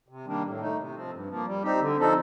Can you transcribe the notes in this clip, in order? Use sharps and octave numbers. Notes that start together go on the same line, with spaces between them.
C3
D#3 G3 A#3 D4
A2
A3 D#4
C3
F3 C4
G2
F3
A#3
G3
C4 D#4 G4
D3
F3 C4 D#4 A4